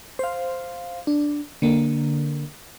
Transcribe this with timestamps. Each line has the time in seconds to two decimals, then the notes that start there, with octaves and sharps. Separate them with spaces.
0.19 C5 F5
1.07 D4
1.62 D3 A#3